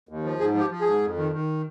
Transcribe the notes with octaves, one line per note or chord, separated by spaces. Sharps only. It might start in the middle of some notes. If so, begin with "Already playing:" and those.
D#2
F3
G#2 G#4
F3
G4
F3
G#4
G#2
F2
D#3
D#3